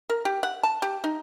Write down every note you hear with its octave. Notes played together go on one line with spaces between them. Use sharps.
A#4
G4
F#5
A5
G4
D#4